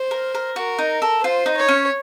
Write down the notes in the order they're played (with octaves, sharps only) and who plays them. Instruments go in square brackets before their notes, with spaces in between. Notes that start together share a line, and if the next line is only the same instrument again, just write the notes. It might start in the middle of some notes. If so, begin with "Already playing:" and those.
Already playing: [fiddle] C5
[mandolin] A#4
A#4
[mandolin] F#4 [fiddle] A#4
[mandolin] D#4
A4
[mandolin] F4 [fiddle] C5
[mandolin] D#4
[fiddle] C#5
[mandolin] C#4